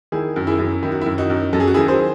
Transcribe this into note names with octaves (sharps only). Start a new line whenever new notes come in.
D#3 E4 G#4
F#2
E4 G#4
F#2
D#3 E4
F#4
F#2 E4
D#4 F#4
F#2
F#2 A4
G#4
F#4
D#3 E4 G#4
G#4 C5